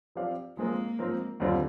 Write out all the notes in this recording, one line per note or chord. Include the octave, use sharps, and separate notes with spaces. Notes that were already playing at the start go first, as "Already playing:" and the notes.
F3 C4 G4 D5 F5
F3 G#3 A#3 C4 F4 A#4
G#2 F3 C4 D#4 A#4
D#2 D3 G3 C4 F4